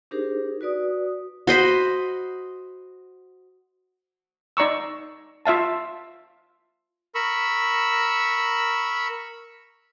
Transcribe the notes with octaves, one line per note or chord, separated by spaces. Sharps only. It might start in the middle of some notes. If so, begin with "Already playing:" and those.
D4 D#4 G4 G#4 A#4 C5
F#4 B4 D5 D#6
F#4 C5 D#5 B5
D#4 D5 A#5 C#6 E6
F4 E5 F5 A5
A#4 B5 C#6 E6